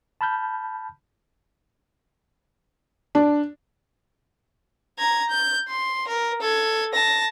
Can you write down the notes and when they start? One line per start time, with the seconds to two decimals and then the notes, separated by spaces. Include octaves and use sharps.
0.21 A5 B5 F6 G6
3.15 D4
4.99 A#5 G#6
5.29 G6
5.68 C6
6.08 A#4
6.41 A4 G#6
6.93 A5 A#6